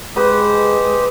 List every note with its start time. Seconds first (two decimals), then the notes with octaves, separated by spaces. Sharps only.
0.16 G#3 G4 B4 C5 B5 D#6